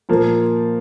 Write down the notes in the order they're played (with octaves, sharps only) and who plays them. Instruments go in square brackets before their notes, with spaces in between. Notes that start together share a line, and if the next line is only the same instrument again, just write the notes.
[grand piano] A#2 F3 A#3